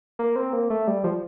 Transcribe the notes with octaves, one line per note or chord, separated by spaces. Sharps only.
A#3
C4
A#3
A3
G3
F3